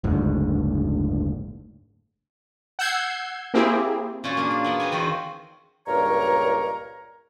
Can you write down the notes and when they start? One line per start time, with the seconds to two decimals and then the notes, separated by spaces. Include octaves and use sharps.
0.04 F#1 D2 G#2
2.79 F#5 E6 G6 G#6 C7
3.54 A#3 C4 E4 G4 G#4
4.24 A#2 C#4 F4 F#4
4.37 A#3 D4 G#4
4.51 D4 G#4
4.64 B3 A#4 F#5
4.80 C4 B4 G#5
4.92 E2 D#3 F4 F#4 C5
5.87 C#2 G2 A#2 A#4 C#5 A#5